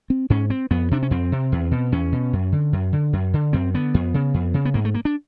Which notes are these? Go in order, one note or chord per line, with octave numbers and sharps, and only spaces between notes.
C4
G#2 C#4
C4
F2 B3
C3 D4
C#4
F2 C4
C3
E2
B2
E2 C#4
B2
F#2
D3
F#2
D3
F#2
D3
F#2 C4
D3 B3
F2
C#3
F2
C#3
B3
G#2 A#3
A3
A#3
D4